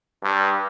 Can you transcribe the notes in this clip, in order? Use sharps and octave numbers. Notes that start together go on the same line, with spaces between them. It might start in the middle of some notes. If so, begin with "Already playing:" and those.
G2